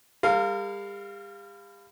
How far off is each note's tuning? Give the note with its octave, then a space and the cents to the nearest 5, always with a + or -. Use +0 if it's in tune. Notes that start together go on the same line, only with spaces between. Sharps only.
G3 +40 A#4 -35 F5 +0